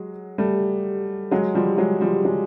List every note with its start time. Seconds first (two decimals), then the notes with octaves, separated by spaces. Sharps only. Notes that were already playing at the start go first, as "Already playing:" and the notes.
Already playing: F#3 G#3
0.38 G3 A3
1.31 F#3 G#3
1.55 F3 G3
1.78 F#3 G#3
2.01 F3 G3
2.25 F#3 G#3